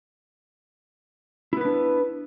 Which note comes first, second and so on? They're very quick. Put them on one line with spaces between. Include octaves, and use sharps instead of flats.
E4 B3 B4 D4